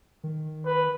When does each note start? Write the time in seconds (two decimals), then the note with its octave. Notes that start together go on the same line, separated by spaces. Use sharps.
0.24 D#3
0.66 B4